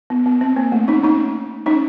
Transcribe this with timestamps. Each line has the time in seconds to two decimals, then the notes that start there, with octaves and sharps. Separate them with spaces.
0.10 B3
0.26 B3
0.41 C4
0.56 A#3
0.72 A3
0.88 C#4 D#4
1.04 C#4 D#4
1.66 C#4 D#4